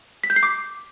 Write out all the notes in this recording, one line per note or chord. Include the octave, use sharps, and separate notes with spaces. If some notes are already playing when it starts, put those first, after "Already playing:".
B6
G6
C7
D6